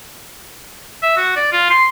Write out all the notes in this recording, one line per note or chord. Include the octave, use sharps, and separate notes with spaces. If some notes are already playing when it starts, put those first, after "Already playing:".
E5
F#4
D5
F4
C6